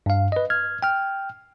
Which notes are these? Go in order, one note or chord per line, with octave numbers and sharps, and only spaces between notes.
G2 F5
B4 D#5
F6 G#6
G5 F6